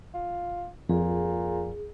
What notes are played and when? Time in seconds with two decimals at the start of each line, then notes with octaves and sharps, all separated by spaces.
0.14 F4
0.89 F2 A#2 G#4